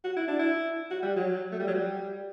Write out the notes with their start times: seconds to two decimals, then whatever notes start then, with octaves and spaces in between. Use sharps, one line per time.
0.04 F#4
0.16 E4
0.27 D4
0.39 E4
0.90 F#4
1.02 G3
1.16 F#3
1.52 A3
1.59 G3
1.67 F#3
1.74 G3